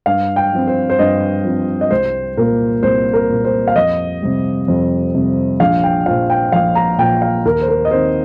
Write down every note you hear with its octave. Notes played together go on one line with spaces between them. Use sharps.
G2 F5
G5
F3 C4
C5
C5
G2 D#5
F3 C4
D#5
C2 C5
A#2 A#3 A#4
C2 C5
A#4
A#2 A#3
C5
F5
F2 D#5
C3 G3
F2
C3 G3
A#1 F5
G5
A#2 F3 F5
G5
A#1 F5
A#5
A#2 F3 G5
F5
D#2 A#4
C5
A#4
D#5
D#3 C4 C5